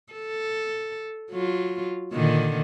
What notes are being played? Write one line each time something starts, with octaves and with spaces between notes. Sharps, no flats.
A4
F#3 F4
A#2 D3 D#3